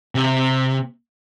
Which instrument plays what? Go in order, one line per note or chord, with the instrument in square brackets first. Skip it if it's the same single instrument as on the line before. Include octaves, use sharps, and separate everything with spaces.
[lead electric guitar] C3